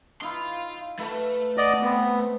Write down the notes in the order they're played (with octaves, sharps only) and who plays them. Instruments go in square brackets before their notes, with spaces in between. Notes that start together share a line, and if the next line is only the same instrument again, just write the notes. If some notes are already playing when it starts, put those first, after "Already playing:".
[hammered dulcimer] D#4 E4 [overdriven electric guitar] F5 C6
[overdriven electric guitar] A3 [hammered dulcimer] B4 F5 B5
[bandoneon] D5 D#5 [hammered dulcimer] F#5
[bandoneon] B3 [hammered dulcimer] C4 B4